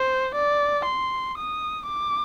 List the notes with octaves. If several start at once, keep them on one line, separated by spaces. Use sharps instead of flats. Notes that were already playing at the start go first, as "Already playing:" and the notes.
Already playing: C5
D5
C6
D#6
D6